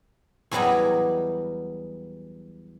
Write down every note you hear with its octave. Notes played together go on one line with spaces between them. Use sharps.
E2 E3 F#3 G3 G4 D#5